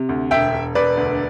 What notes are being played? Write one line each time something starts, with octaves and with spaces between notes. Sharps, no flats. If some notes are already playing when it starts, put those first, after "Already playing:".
Already playing: C3
D2
E1 E5 G5
E1
E1 B4 D5
D2